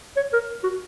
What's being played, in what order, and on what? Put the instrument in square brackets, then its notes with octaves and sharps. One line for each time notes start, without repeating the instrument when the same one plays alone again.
[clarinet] C#5
A#4
F#4